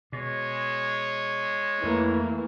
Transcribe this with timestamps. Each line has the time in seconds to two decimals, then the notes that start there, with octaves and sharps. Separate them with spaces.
0.13 B2 G#3 C#5
1.83 F2 E3 A3 A#3